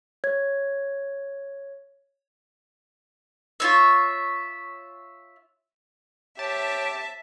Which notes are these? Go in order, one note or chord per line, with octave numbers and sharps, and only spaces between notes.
C#5 G#6
F4 C#5 E5
G4 C#5 E5 A5